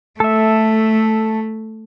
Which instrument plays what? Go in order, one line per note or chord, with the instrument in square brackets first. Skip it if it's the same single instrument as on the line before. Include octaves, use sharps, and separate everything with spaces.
[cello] A3 [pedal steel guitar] A4 E5